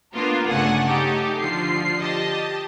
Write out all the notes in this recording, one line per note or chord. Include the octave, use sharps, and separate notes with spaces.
A#3 B3 D4 F4 A#4
G1 C#3 A3 D4 F#5 G#5
A3 D#4 G4 A4
D3 F3 F4 C7
G4 D#5 A5